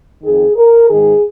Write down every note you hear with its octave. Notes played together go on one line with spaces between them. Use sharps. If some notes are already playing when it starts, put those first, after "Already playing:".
F2 D#3 G#4
A#4
G#2 D#3 G#4